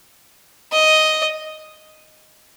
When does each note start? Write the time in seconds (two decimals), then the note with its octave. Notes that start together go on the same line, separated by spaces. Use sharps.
0.72 D#5